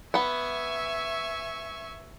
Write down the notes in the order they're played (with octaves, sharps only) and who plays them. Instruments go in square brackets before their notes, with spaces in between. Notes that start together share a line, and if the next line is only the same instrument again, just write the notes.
[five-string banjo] B3 F#5 [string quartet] E5 G#5 C#6